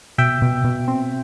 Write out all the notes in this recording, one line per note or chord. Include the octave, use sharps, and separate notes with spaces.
B2 E5 G5
B2
B2
C4